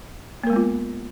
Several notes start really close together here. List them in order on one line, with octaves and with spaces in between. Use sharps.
A#3 A#4 G#3 B3 F4